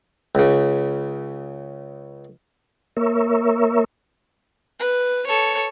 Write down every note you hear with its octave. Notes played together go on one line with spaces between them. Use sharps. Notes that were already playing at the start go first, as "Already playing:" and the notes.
C#2 C#3
A#3 A#4 C#5 E5
B4
A4 C#5